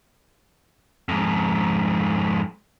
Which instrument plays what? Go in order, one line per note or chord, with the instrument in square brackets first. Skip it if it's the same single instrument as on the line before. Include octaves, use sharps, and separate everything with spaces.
[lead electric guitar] F2 G#2